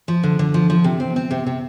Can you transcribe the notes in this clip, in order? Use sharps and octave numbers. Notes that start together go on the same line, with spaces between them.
F3
D3
D3
F3
F3
C3
C4
C4
C3
C3